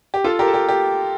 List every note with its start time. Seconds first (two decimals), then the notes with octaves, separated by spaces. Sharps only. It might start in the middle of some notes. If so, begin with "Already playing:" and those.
0.14 G4
0.24 F4 A4
0.39 G4 A#4
0.47 A4
0.54 G4
0.69 G4